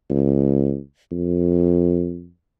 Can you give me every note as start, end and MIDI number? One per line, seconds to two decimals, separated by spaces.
0.10 0.79 37
1.11 2.30 41